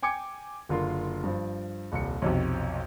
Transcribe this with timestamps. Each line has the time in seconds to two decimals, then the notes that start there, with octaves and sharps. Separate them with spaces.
0.03 G5 G#5 D6 G#6 C#7
0.69 F#1 D3 F4 A#4 C6
1.24 G2 F3
1.92 D#1 C2 C#7
2.22 B1 F2 C3